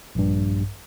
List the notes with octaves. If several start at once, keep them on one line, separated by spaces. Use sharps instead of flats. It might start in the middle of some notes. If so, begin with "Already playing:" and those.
A#1 G2